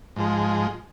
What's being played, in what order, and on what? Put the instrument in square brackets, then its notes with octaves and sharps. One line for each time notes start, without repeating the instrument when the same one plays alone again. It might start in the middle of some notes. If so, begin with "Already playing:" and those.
[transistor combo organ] G#2 F3 G#3